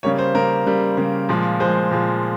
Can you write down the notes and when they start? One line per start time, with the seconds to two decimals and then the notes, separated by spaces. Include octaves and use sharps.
0.03 C#3 G3 A#3 C#5
0.19 C5
0.34 C#3 G3 A#3 A#4
0.66 C#3 G3 A#3
0.97 C#3 G3 A#3
1.29 A#2 F3 G#3
1.60 A#2 F3 G#3 C5
1.91 A#2 F3 G#3